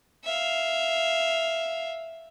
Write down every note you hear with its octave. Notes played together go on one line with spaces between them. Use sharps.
E5 F5